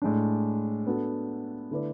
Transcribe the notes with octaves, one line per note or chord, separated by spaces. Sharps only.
A2 G#3 D4
B3 D4 F#4 A4
D3 A3 E4 B4 D5